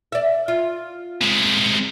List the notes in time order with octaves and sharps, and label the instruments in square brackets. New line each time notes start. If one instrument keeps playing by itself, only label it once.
[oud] D5 E5
F4
[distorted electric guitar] C3 G#3